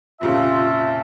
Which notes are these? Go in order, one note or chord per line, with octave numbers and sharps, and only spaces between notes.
F1 A#2 C#3 F4 E5 A5